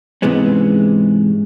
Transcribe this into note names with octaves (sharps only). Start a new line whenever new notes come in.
G#2 C3 E3 G#3 B3 C#4